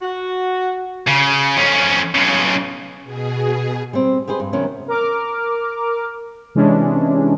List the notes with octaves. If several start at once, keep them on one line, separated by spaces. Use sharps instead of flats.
F#4
C#3
F2 C#4
B1 C#3
B2 G#4
G3 C4
G4 G#4 B4 C5 D#5
G2
C3 D#3 F#3 B3 C#4
A#4 D6 F6
C3 E3 G#3 C#4 D4